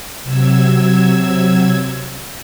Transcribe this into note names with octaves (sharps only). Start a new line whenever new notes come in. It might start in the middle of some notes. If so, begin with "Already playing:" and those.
C3 F#3 E6 G#6